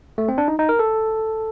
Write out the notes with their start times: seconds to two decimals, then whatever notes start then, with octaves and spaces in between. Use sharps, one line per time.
0.18 A3
0.28 C4
0.38 D4
0.48 D#4
0.59 D#4
0.69 A#4
0.79 A4